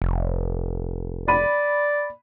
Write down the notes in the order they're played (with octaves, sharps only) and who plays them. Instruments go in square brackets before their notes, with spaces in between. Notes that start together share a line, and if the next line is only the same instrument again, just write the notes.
[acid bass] F1
[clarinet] D5 [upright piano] B5 D#7